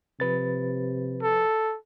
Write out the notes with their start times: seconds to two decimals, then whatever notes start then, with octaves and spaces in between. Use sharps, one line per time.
0.20 C3 F3 B4 A6
1.23 A4